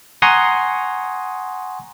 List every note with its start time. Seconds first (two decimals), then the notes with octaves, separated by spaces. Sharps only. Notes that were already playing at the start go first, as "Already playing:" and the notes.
0.22 F#5 G#5 A#5 C6 C#6 D#6